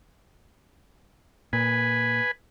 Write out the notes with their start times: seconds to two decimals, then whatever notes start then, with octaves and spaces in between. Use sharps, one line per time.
1.53 A#2 B4 G#5